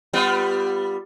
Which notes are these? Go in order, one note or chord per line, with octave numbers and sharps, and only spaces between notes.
G3 B3 F4